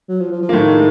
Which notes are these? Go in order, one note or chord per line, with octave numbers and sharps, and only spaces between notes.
F#3
F3
F3
F3
A#3
A2 D#3 A3
G#3